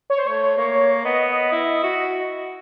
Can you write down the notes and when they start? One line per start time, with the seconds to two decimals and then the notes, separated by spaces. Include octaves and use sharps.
0.10 C#5
0.19 C5
0.26 A3 C#5
0.57 A#3 C#5
1.04 B3 D#5
1.52 E4
1.83 F#4